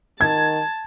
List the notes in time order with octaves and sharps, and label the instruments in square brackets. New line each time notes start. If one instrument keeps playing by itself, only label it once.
[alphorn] D#3 [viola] A5 [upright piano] G#6